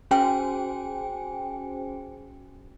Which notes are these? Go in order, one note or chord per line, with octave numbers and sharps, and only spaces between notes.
C#4 F#4 G#4 C5 G5 G#5